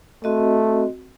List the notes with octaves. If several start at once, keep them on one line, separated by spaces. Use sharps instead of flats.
A3 C4 F#4 D#5